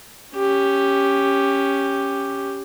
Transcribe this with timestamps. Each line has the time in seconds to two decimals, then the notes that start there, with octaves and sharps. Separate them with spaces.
0.36 C#4 G4